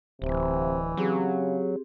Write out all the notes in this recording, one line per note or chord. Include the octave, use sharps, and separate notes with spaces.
D1 C3 E3
C#3 F#3 C4 G4 G#4